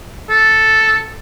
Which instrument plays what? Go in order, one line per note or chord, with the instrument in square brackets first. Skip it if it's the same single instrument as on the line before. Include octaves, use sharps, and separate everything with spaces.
[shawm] A4